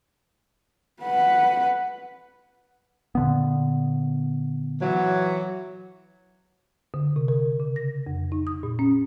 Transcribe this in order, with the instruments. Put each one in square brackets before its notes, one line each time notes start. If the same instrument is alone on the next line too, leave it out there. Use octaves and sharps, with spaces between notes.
[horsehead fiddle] B4 F#5
[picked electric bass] A#2 D3 B3
[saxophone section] E3 F#3
[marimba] D3
C3
A#4
C#3
A#6
F2
D#4
D#6
A#2
C#4